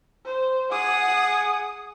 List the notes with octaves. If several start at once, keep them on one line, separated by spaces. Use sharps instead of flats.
C5
G#4 F#5 D#6